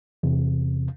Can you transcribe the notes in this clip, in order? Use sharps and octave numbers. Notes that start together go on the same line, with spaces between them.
E2 C3